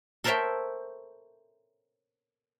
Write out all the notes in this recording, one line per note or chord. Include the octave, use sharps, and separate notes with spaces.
A4 A#4 C5 C#5 E5 G5